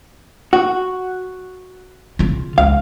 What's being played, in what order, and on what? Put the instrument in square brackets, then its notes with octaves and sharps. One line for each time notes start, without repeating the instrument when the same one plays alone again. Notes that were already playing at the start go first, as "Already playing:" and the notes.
[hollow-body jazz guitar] F#4
[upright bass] C#3 F4
[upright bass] C#2 [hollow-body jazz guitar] F5